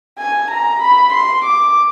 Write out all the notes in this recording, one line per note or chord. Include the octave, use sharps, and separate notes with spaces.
G#5
A#5
B5
C6
D6